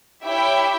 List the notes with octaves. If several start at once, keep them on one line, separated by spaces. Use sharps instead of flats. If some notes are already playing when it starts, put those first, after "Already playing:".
E4 G4 C#5 E5 G5